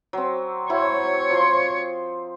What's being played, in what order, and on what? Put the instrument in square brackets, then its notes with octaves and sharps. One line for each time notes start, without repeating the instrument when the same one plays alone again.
[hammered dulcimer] F#3 C4
[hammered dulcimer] F#3 E4 C5 [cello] C#5
[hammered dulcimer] F3 C6